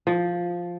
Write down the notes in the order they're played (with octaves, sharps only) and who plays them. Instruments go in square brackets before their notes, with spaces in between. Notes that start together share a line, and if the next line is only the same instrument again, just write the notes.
[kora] F3